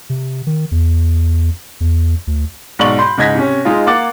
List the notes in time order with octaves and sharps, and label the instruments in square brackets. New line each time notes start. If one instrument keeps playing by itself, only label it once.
[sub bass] C3
D#3
E2
E2
D2
[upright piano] B1 G#2 D5 C#6 F#7
B5 C6 G6
C#2 G#2 D#5 G#6 A#6 B6
C3 C#4
G#3 D#4 F4
A#3 F5 F#5 D6 A6